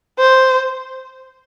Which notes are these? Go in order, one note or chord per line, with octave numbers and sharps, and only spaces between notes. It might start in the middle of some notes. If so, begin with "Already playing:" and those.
C5